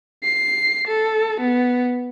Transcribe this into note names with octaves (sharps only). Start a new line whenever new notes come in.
C7
A4
B3